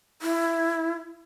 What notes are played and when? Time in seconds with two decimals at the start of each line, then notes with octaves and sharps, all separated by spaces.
0.22 E4